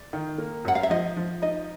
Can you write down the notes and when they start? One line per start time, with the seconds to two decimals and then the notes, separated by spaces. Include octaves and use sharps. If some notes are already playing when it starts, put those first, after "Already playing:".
Already playing: D5
0.13 D#3
0.38 A#3
0.65 F#2 F#5
0.75 F5
0.83 E5
0.90 F3 D#5
1.16 F3
1.42 D#4 D#5